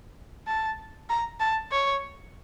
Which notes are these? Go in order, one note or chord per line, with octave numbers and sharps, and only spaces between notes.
A5
A#5
A5
C#5